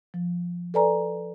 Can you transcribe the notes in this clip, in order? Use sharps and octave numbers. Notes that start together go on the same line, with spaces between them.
F3
A4 B4 D5 G#5 A#5